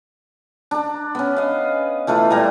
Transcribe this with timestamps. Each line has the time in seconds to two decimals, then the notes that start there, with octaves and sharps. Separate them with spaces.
0.71 D4 A#5
1.15 B3 C#4
1.37 D#5 F5
2.07 E3 A3 F4 B4
2.30 A#2 G3 A#5